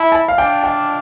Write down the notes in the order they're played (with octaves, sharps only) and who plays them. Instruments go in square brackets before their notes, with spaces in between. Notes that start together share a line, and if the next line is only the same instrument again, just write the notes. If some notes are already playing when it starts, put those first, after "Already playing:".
Already playing: [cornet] E4 [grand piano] A5
[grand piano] A5
F5
[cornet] D4 [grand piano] G5
[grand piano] G5